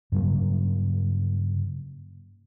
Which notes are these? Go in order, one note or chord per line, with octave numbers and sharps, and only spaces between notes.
G2 C#3 F#3 A#3